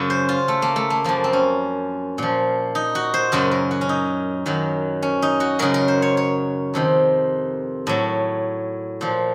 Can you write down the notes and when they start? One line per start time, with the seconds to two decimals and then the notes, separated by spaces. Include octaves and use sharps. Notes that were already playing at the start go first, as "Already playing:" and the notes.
Already playing: F#2 C#3 F#3
0.10 C5
0.29 F4
0.48 A3
0.62 A#3
0.76 A3
0.90 A#3
1.04 F#2 F3 A#3
1.24 C4
1.33 C#4
2.18 A#2 F3
2.75 D#4
2.95 F#4
3.14 C5
3.32 F#2 C#3 F#3 A#4
3.51 A#4
3.71 F#4
3.81 C#4
3.89 D#4
4.46 F#2 D#3 F#3
5.02 C#4
5.22 D#4
5.40 F#4
5.59 F#2 C#3 F#3 A#4
5.74 A#4
5.88 C5
6.02 C#5
6.17 C#5
6.74 F2 C3 D#3
7.87 A2 F#3
9.01 A#2 F3